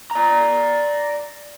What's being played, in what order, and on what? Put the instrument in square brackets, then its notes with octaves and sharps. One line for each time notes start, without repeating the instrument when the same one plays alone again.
[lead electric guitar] D5 A#5